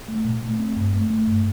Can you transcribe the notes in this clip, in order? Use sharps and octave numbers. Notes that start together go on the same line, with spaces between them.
A3
A#2
A3
C4
G2
A3
A3
G2